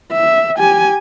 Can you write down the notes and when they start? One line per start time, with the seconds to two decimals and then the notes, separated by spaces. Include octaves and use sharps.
0.12 E5
0.58 G4 G#5